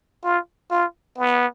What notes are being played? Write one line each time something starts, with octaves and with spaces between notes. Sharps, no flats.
F4
F4
B3